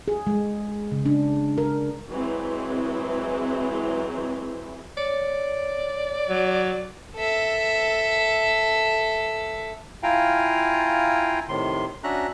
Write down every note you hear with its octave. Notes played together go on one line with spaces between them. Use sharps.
G#4
G#3
C#3
D4
A#4
E3 F#3 G#3 C4 E4
C#5 D5
F#3
A4 E5
E4 F4 F5 G5 G#5 A#5
A2 C3 D#3 C6
C#4 D4 F#4 E5 A#5 F#6